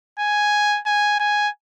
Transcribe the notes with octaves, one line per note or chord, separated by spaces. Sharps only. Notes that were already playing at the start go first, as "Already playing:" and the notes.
G#5
G#5
G#5